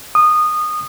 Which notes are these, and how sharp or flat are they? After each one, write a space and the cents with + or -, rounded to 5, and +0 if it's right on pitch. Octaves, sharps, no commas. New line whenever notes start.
D#6 -20